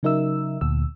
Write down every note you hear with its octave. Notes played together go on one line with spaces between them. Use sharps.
C#3 F#3 D#4 A#4 E5 E6
D2 A#2 E6